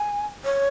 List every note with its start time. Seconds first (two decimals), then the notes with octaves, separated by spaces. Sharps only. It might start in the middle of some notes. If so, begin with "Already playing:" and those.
Already playing: G#5
0.45 C#5